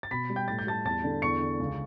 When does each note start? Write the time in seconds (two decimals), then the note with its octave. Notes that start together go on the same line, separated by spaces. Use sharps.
0.03 A6
0.11 B2 B5 B6
0.30 G3
0.36 G5 G6
0.48 A2 A6
0.59 G6
0.67 G3 A5 A6
0.85 E2 A5 A6
1.04 D3
1.22 E2 C#6 C#7
1.41 D3
1.60 C#2